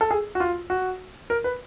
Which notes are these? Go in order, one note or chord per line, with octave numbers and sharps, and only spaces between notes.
A4
G#4
F#4
F4
F#4
A#4
B4